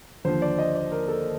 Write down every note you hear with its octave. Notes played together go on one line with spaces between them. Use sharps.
D#2 D3 F3 C5
D5
D#5
D5
A#4
A4